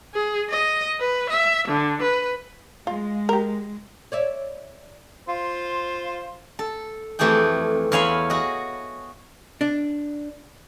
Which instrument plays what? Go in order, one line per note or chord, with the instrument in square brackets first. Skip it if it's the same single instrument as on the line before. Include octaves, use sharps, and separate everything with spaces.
[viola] G#4
D#5
B4
E5
D3
B4
[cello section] G#3 [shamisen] F4
[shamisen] G4 A#4
[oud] C#5 D5 E5
[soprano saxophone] F4 [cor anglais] C5
[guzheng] A4
F2 E3 A3 G4 G#4 G5
E2 C#5 F5 G#5 B5 C6
F#4 G#4 D#5
[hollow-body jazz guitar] D4